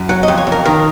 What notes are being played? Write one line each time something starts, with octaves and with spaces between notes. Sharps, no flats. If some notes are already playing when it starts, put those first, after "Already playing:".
Already playing: F#2
F#3 F#5
D#5
F2
C#5
F2
A#4
D#3 A#4